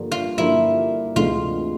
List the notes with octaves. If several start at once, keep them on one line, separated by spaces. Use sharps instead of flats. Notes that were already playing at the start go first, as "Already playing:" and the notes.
Already playing: G2 D3 F3 A#3
F4
G2 D3 F3 A#3 D4 E4
D2 C3 E3 G#3 F4